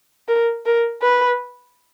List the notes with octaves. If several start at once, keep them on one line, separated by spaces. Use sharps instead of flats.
A#4
A#4
B4